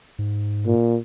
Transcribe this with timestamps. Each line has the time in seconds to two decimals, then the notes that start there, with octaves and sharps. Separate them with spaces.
0.19 G#2
0.66 A#2